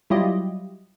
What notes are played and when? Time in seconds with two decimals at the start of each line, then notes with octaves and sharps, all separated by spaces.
0.10 F#3 G3 E4 F4 G4 D#5